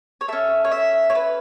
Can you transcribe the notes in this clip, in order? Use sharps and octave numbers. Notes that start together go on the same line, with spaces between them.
C#5
C#4 A4 E5
C#5
E5
C#5
B4